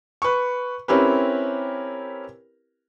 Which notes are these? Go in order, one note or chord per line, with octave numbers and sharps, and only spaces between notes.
B4 C#6
C4 C#4 E4 G4 A#4 B4